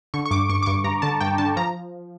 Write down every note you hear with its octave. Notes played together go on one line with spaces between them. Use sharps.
D3 C#6
C#6
G2 D6
G2 C#6
D6
G2 C#6
G2 A#5
D3 A5
G2 G5
D3 A5
F3 A#5